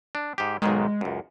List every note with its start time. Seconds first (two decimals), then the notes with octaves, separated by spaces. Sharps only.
0.15 D4
0.38 G#2 G4
0.62 B1 G#2 D#3 G#3
1.01 C#2 F#2